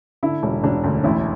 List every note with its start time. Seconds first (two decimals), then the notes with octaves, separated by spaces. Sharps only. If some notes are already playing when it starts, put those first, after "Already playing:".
0.23 D3 E4
0.43 E1
0.63 E1 D4
0.84 D2
1.04 A1 E4